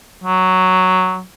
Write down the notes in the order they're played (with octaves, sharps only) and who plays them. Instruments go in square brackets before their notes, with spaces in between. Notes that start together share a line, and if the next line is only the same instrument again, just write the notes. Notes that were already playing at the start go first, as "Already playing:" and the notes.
[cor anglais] F#3